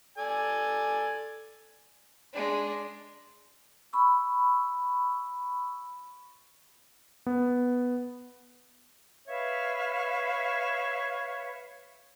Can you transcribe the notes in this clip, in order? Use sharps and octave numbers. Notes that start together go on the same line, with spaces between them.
A4 D5 G#5
G#3 D4
B5 C#6 E6
B3
B4 C#5 E5 F5